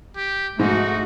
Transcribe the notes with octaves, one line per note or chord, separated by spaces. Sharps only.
G4
G#2 A3 D#4 F#4